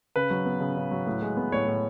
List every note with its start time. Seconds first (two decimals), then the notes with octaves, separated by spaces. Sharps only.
0.16 C#3 B4
0.31 F#3
0.46 B3
0.60 C#3
0.77 C#3
0.91 F#3
1.06 A2
1.22 G#3
1.37 B3
1.52 A2 C#5
1.67 A2